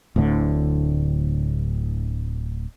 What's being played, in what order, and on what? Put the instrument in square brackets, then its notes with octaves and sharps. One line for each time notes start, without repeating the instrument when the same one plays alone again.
[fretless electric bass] D1 D2 A2 D3